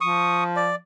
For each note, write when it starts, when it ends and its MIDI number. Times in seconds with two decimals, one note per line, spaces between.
0.01 0.76 53
0.01 0.44 85
0.01 0.44 87
0.56 0.75 74